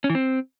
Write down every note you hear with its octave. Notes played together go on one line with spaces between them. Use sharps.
C#4
E3
C4